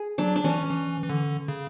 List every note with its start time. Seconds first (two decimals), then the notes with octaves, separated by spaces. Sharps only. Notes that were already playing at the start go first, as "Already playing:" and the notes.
Already playing: G#4
0.18 F#3 D4
0.36 D4
0.44 E3 C#4
0.70 E3
1.03 E3
1.10 D3
1.48 C#3